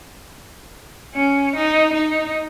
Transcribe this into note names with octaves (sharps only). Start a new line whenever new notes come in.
C#4
D#4
D#4